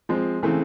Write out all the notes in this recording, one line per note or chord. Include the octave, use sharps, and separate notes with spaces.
F3 G#3 C4
C#3 E3 A3 C4